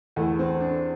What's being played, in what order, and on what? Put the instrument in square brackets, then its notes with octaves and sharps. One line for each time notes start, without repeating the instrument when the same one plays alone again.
[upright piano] E2 E3 [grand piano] A3
[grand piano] C4
D4